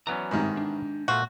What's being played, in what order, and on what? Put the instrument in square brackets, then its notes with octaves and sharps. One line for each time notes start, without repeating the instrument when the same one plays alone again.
[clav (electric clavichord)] E3 B3 C#4 [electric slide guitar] F#3 D5 A#5
[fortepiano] G#2 C3 D#3
[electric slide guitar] D4
[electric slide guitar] A#2 [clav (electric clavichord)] A3 F4 C5 [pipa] F#4